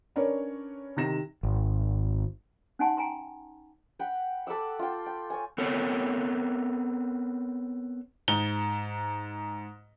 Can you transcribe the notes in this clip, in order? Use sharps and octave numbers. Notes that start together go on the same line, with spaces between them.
C#4 D4 A#4 B4 C#5 D5
C3 D#3 A#6 E7
G#1
C#4 D#4 F#5 G#5 A5 C6
G5 G#5 A#5 C6
F#5 G5 B5
A4 B5 D6 E6
F4 G5
G5
C#5 G#5
B3 C4 A4 A#4 C#5
G#2 G7